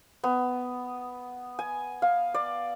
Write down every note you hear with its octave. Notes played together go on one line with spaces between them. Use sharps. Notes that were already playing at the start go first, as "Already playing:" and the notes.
B3
G#5
F5
D5